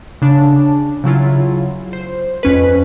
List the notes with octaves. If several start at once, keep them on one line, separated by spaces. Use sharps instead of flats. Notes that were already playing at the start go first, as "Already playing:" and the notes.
C#3 D4 A5
C#3 F#3 E4 F4
C5
F2 C#4 B4